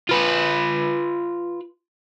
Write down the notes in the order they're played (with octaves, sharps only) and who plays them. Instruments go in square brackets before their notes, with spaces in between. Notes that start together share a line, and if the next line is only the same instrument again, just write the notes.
[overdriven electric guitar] F4 B4